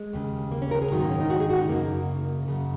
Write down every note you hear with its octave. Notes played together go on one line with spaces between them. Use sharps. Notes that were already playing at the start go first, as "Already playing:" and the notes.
Already playing: G#3
D#2 C#3
A#3
C#4
A#4
G#4
G#2 D#3 F#3
A#3
C#4
D#4
F#4
G#4
F#4
D#4
F#2 C#3 A#3
F#2 C#3